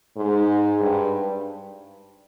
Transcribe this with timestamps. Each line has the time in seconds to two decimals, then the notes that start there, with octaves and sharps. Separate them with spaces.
0.17 G#2
0.81 G2